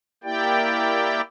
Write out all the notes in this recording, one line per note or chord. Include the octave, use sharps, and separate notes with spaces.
A#3 E4 G4 D5 G5